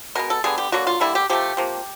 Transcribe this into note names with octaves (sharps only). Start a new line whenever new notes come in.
B2 G#3 B3 A#4
A4
D3 G3 B3 G#4
G4
D3 F#3 A#3 F#4
F4
D3 G3 A#3 E4
G4
C3 F3 A3 G4
C3 F3 A#3